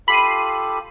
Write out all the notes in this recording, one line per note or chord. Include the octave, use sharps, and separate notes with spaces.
F4 G4 A4 B5 C7 D#7